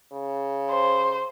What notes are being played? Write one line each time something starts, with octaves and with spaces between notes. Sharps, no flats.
C#3
C5